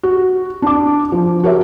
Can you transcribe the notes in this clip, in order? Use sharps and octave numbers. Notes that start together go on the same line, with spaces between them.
F#4
D4 D6
F3
F#4 G4 A#4 C#5 E5